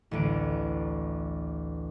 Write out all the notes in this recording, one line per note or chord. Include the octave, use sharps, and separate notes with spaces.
A1 D2 D7